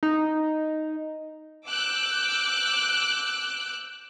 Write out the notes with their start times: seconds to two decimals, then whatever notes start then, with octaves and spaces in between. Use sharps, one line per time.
0.03 D#4
1.67 D6 E6 F#6 G6